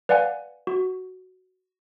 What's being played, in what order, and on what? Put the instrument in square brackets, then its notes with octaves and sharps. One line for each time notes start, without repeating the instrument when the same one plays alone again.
[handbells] B4 D5 F5 F#5 G#5
F#4